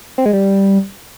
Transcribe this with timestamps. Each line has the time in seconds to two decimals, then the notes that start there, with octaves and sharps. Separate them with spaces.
0.18 C4
0.26 G#3
0.33 G3